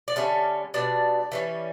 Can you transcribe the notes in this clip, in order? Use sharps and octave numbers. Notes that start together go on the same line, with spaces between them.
D5
D3 G3 C#4 E5
B2 G3 D4 D5
E3 G3 C#4